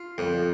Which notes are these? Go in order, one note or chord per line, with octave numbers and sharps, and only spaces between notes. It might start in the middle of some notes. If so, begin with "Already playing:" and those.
Already playing: F4
F2